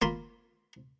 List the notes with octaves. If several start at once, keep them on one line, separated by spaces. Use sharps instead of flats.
A#3 F4 B5